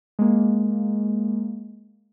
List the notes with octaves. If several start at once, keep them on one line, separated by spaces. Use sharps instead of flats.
G#3 A#3